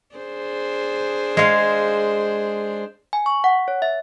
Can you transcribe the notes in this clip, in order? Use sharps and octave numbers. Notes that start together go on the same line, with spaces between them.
D4 G#4 C5
G#3 F5
G#5
C#6
F#5
C#5
E5